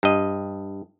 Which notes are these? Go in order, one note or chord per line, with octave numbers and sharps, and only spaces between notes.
G2 D#5